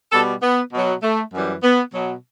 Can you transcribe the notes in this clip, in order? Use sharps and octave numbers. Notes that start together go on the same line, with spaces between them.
B2 G3 A4
B3
B2 F#3
A3
F#2 E3 G3
B3
B2 F#3